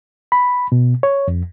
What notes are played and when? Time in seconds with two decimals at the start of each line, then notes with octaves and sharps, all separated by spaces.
0.32 B5
0.72 B2
1.03 C#5
1.28 F2